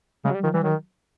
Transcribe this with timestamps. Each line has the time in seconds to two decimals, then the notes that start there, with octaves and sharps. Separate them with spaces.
0.25 C#3 G#3
0.30 F#3
0.34 G3
0.44 D#3 F3
0.54 E3 G3
0.63 D#3 F#3